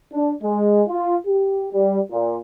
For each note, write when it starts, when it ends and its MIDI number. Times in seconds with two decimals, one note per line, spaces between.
0.12 0.31 62
0.42 0.82 56
0.87 1.15 65
1.26 1.66 67
1.73 1.98 55
2.10 2.36 46